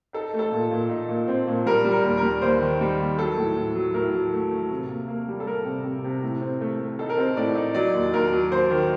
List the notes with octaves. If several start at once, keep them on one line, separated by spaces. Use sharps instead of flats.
D#4 A4
A3
A4
A#2
A#2
D#4
A#2
C4
A#2
G3 A#4
G3
A#4
D#2
A#4
G3
D#2 C5
D#3
G3
D#2
F#3 A4
A2
A2
F#3
A2 A#4
F#3
A3
A3
C3
A#3
A#3
G3
A4
G3 A#4
C3
C3
C3
A2
C4
A3
A3
D#4 A4
A#4
C4 A4
A2 D5
D#4
F#3 D5
D#2
D#2 A#4
F#3
D#2 C5
D#3